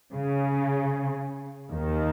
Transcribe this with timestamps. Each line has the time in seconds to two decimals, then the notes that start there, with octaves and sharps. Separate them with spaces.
0.14 C#3
1.73 D#2 D#3